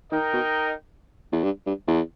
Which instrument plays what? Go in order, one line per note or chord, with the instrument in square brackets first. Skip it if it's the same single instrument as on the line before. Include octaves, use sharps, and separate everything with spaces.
[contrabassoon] D#3 [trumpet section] D#4 A#4 D#5 G5
[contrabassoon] B2
E2
G2
G2
E2